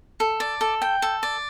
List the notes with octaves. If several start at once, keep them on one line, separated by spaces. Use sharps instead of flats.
A4
D5
A4
G5
A4
D5